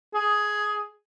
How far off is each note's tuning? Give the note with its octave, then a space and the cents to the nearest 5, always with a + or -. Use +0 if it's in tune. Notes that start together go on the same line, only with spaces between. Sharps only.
G#4 +10